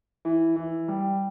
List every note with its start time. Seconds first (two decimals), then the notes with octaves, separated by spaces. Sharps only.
0.25 E3
0.56 E3
0.88 G3